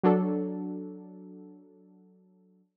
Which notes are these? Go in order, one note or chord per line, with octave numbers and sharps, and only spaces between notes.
F#3 D4 A4